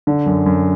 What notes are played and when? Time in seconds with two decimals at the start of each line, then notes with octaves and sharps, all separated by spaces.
0.07 D3
0.26 F#2
0.46 F#2